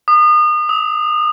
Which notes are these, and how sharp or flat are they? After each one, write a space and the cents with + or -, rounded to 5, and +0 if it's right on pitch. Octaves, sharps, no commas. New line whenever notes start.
D#6 -35
D#6 +40